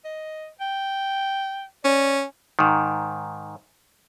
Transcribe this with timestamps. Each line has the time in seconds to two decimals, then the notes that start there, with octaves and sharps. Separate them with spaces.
0.05 D#5
0.61 G5
1.84 C#4 D5
2.59 G#2 D#3